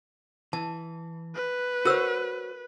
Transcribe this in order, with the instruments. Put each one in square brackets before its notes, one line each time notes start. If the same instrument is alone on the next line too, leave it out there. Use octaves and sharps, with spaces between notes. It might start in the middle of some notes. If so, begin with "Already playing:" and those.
[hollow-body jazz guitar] E3 [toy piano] A5
[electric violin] B4
[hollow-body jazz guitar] F#4 C5 C#5 [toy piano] A#4 E6